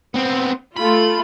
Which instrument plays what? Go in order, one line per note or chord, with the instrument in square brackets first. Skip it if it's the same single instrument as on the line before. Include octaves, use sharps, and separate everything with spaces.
[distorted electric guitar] B3 C4
[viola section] A3 F4 [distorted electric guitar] B5